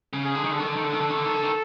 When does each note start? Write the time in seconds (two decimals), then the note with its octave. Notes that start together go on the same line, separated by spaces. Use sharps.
0.13 C#3
0.24 G#4
0.35 D3
0.44 D#3
0.51 D3
0.57 D#3 A4
0.67 D3
0.76 D#3
0.84 D3
0.93 D#3
1.00 D3
1.10 D#3
1.17 D3
1.25 D#3
1.34 D3
1.43 D#3